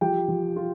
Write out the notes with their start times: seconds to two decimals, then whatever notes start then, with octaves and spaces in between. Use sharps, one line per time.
0.01 F3 G4 G5
0.28 F3
0.56 F4